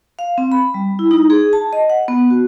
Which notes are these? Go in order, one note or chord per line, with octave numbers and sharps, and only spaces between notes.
F5
C4
B5
G3
E4
D#4
G#4
A5
D#5
F#5
B3
F#4